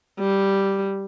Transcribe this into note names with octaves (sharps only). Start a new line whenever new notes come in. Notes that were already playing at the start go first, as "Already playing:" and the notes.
G3